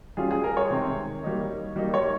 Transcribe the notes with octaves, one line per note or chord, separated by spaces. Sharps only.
G3 C#4 F4 G#4
G#4
A#4
C#5
C3 D#3 G#3 C4
G3 A#3 D#4
G3 A#3 D#4
C#5